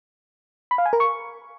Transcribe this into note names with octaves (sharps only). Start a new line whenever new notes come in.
B5
F5
G#5
A#4
C#6